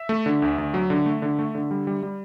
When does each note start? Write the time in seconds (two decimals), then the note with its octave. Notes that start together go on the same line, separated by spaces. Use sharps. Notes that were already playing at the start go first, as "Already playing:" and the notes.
Already playing: E5
0.09 A3
0.26 D3
0.42 D2
0.58 D2
0.74 F#3
0.90 D3
1.06 A3
1.22 D3
1.39 A3
1.55 D3
1.71 G3
1.87 G3
2.03 G3